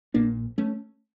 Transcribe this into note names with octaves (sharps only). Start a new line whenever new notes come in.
A#1 A#2 A#3 D4
A3 C#4